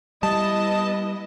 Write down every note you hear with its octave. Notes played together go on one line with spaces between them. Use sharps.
G3 B3 E4 D#5 A5